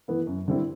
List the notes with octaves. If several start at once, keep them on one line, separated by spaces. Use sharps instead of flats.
E3 B3 E4
F#2
D3 G3 C4 E4